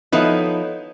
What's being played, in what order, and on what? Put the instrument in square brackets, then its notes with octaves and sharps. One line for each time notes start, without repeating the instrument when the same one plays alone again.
[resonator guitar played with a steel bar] F3 D#4 E4 [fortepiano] B3 [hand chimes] A4 C#5 D#5